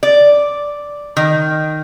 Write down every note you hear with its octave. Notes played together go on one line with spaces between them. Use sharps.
D5
D#3